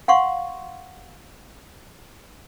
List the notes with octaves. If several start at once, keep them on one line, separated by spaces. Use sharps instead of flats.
F5 F#5 C6 C#6